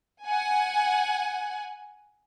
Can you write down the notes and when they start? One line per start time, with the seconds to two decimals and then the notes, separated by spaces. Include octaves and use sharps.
0.23 F#5 G#5